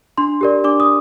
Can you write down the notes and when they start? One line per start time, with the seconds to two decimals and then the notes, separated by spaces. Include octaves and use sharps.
0.18 D4 C6
0.41 G4 A#4 D5
0.64 D4 D6
0.80 D#6